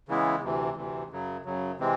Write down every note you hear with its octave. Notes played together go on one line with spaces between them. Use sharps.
C#3 E3 G#3 B3 E4
D2 C3 E3
D2 C3 E3
F#2 C#3 F#3
F#2 C#3 F#3
C3 E3 G#3 C4